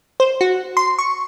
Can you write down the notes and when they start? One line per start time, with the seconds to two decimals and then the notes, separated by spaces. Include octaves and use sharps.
0.20 C5
0.41 F#4
0.77 C6
0.99 C#6